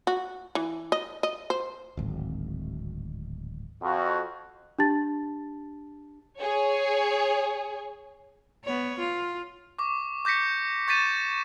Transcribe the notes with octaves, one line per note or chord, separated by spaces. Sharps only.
F#4
E3
D#5
D#5
C5
D1 G#1
F2 F#4
D4 G4 A5 A6
G#4 C#5
B3 C#5
F4
C#6 D6
D6 G6 A#6 B6 C#7
C#6 G6 A6 B6 D#7 E7